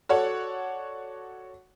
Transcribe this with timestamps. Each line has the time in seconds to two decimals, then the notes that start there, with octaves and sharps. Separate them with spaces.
0.09 F#4 A4 C#5 D5 F#5